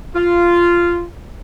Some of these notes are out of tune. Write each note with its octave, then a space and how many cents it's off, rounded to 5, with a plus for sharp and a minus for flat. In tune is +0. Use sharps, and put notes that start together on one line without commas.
F4 -10